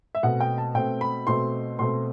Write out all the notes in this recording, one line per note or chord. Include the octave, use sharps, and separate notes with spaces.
E5
B2 A3 C4 F#5
G5
A5
B2 A3 C4 G5
B5
B2 A3 C4 C6
B2 A3 C4 C6